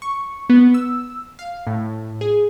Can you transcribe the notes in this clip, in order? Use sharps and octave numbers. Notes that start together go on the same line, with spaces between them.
C#6
B3
E6
F5
A2
G#4